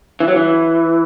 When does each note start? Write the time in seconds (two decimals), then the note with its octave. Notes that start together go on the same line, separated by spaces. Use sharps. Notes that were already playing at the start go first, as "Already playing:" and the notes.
0.20 E3
0.28 F#3
0.36 E3